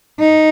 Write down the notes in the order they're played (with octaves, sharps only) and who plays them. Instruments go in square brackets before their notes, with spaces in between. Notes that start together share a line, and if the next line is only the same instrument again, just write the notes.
[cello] D#4